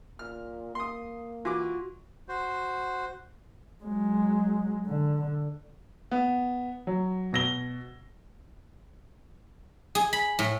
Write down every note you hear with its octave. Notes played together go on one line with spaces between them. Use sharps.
A#2 F6
A#3 C6 D#6
E3 F4 F#4 D6
F#4 C5
F#3 G#3
D3
B3
F#3
B2 A#6 G7
G#4
B5
A2